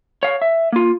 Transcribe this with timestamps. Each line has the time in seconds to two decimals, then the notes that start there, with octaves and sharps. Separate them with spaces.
0.23 C#5 F5
0.42 E5
0.72 A#3 F4